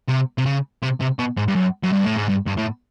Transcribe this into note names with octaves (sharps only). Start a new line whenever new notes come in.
C3
C3
C#3
C3
C3
B2
G#2
G2
F#2
F#2
G2
A2
G#2
G2
G2
A2